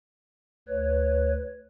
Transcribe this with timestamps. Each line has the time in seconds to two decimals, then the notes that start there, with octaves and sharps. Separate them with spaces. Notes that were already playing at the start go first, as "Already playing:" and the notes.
0.69 D2 B4 C#5